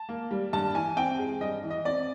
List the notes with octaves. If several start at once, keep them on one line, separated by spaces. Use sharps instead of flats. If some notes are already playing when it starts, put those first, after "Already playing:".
Already playing: A5
A#3
G3
G2 A5
E3 G#5
C4 G5
G#3
G2 D#5
E3
D#5
C4 D5